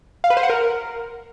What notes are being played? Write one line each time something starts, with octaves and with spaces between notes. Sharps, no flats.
F5
B4
C5
F#5
A#4